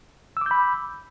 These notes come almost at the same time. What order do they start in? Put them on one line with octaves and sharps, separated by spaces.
E6 D6 G6 B5